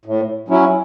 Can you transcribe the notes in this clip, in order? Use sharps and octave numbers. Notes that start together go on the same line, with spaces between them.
A2
F#3 C#4 E4